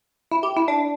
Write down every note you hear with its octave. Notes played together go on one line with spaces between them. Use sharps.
E4
G4
E4
D4